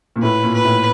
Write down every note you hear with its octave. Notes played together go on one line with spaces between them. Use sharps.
A#2
A2 B4
A#2
B4
A2